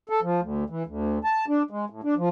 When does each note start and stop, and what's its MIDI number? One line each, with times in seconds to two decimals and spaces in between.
0.09 0.20 69
0.22 0.41 53
0.41 0.64 38
0.70 0.83 52
0.86 1.18 38
1.24 1.45 81
1.48 1.62 62
1.70 1.85 56
1.90 2.01 45
2.04 2.14 62
2.17 2.29 53